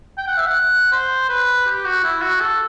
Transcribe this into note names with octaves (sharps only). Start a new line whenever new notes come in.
G5
F#5
E5
F#5
C5
B4
G4
F#4
E4
F#4
A4